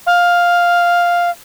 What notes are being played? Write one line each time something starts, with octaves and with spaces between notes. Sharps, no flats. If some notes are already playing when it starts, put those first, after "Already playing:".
F5